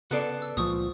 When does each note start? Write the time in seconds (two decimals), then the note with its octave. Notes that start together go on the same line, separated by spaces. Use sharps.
0.11 C#3 B3 A4 D5 F#6 C7
0.42 E6
0.57 C#2 A#2 F3 C#6 D#6